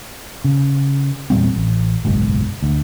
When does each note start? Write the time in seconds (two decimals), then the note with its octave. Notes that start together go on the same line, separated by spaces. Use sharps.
0.44 C#3
1.30 E2 A#2 G3 C4
1.56 A1
2.05 F#1 B1 G#2
2.63 D2